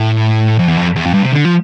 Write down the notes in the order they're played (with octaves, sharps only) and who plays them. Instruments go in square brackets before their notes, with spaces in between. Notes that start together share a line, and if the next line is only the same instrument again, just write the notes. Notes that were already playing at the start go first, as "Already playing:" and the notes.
Already playing: [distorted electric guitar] A2
F2
E2
F2
E2
F2
G2
C3
D3
F3